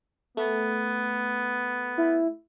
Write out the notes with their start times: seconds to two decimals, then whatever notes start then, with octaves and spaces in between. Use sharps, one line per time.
0.37 A3 B3
1.98 E4